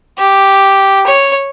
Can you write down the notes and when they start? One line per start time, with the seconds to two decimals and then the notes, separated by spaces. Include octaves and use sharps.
0.18 G4
1.07 C#5